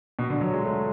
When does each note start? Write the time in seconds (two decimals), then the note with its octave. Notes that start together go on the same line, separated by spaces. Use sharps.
0.19 B2
0.30 D3
0.41 F#3
0.53 G#3
0.65 A3